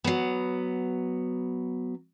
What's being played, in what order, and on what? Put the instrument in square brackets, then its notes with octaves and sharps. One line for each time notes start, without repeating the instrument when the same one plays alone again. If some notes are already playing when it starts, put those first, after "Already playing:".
[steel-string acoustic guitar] F#3 B3